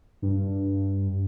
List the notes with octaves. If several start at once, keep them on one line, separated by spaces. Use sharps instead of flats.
G2